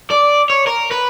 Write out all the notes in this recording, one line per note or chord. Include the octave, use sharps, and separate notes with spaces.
D5
C#5
A#4
B4